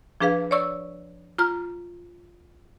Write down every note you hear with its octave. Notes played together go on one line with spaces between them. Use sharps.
F3 D4 G#4 B4 F5
C#5 D5 C#6 E6
F4 A#5 F6